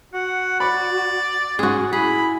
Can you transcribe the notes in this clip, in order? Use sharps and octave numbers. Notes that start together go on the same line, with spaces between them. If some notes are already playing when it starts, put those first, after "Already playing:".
F#4 F#5
D5 B5
G#2 G#3 C#4 F#4 G#4
E4 G#4 B5